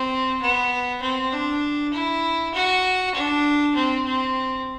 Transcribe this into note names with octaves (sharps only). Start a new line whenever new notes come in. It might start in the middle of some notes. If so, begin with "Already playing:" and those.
Already playing: C4
B3
C4
D4
E4
F#4
D4
C4
C4